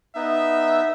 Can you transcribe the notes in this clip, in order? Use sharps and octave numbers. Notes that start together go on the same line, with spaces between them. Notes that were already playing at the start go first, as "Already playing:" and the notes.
B3 D#4 E5